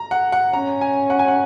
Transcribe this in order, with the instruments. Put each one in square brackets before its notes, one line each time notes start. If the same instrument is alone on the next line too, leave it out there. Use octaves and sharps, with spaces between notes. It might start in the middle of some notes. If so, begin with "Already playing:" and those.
Already playing: [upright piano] A#5
F#5
F#5
[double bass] C#4 [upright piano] A#5
[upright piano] G#5
F#5
G#5
F#5